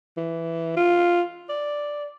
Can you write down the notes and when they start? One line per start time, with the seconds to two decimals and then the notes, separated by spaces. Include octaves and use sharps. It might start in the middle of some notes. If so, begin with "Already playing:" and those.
0.17 E3
0.76 F4
1.49 D5